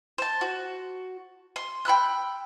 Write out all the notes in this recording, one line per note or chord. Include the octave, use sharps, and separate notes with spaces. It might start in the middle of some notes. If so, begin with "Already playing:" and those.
C5 A5
F#4
C6
G5 B5 E6 F#6